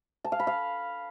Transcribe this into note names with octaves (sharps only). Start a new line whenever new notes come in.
A5
F5
B5
F5